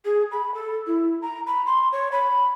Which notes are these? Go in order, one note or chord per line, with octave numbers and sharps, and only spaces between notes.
G#4
B5
A4
E4
A#5
B5
C6
C#5
B5